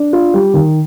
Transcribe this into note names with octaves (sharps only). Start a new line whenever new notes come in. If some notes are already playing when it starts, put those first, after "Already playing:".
Already playing: D4
F4
G3
D#3